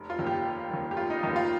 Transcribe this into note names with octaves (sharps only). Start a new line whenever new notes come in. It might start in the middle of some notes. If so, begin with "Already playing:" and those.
Already playing: F1
F4
D#2 D#3
G4
F1
D#2 D#3
G4
F1 F4
D#4
D#2 D#3 D#4
F4